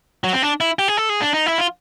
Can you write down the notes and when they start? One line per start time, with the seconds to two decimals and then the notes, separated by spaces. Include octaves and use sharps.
0.24 F#3
0.33 C4
0.42 D4
0.61 E4
0.79 G4
0.88 G#4
0.97 A4
1.09 G#4
1.22 D4
1.34 D#4
1.46 E4
1.58 F4